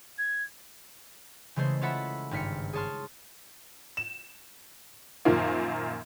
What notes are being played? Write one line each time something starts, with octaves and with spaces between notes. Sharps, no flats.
G#6
C#3 E3 G#3 A3 C5
C#4 F4 A4 E5 F#5 B5
G#1 G2 F6 B6 C#7
G#4 C#5 A5 C6 F6
E7
F#2 A#2 D#3 F3 A#3